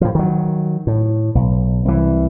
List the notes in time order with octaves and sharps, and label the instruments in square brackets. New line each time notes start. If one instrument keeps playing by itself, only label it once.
[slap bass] A2 F3
D#3 F#3
A2
B1
C2 E3